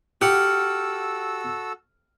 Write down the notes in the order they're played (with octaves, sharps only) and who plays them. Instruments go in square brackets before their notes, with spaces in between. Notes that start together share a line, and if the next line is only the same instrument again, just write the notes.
[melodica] F#4 A4 E6 [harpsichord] G4 F#5 [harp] F6